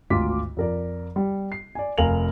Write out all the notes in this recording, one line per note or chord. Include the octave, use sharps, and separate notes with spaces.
G#1 D2 F4 D6 B6
F2 A#4 D5
G3
C7
D5 G#5
F1 A#4 F5 G#5 F7 F#7